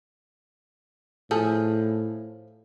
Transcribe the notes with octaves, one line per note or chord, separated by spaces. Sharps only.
A2 F3 G#4 A4